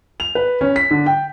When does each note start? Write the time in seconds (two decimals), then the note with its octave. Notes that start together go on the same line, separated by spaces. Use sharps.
0.20 F7
0.35 B4
0.61 C#4
0.76 B6
0.91 D3
1.06 G5